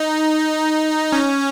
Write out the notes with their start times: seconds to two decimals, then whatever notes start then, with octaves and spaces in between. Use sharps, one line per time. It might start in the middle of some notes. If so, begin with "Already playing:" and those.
Already playing: D#4
1.12 C#4